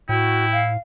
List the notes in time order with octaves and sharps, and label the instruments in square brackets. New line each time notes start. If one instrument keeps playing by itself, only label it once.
[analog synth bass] A2 [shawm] E4 [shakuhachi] F#4 [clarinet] G5
[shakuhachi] F5